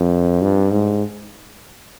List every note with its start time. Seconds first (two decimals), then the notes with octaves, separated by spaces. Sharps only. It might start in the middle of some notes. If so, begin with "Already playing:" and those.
Already playing: F2
0.42 G2
0.72 G#2